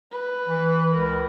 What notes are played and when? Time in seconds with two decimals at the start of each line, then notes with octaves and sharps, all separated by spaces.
0.12 B4
0.48 E3
0.92 C#2 A#4